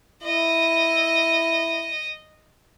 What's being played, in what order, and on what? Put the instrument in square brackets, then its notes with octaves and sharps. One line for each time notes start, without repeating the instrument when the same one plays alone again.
[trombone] E4 [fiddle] D#5